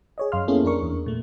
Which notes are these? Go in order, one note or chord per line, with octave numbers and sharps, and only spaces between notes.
G#4 C#5 D#5
F#2 F5 C6 F6
A#3 B3 C#4 E4 G#4 A4
F2 D4 A#4 C#6
E2
A#2 A3